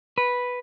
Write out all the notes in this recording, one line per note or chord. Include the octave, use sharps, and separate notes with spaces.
B4